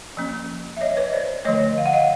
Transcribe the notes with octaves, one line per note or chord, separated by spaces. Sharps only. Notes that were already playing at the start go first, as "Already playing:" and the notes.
F3 A#3 C#4
E5
C#5 D#5
B4 C#5
C5 D5
D3 F3 A3 C#5 D#5
F5
F#5
D#5 F5